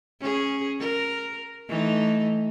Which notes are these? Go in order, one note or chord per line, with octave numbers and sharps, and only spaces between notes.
C#4 G#4
A#4
E3 A3 D#4